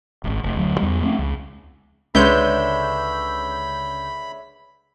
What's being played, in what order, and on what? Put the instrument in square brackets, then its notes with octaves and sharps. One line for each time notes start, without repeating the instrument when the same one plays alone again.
[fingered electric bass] D1 G#1
F1
D2 F#3
E2 G3
F3 A3 C4 C#4
C#2
[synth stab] C#2 G6 [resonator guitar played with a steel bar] D3 G#3 B4 [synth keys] C#5 E5 [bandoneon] B5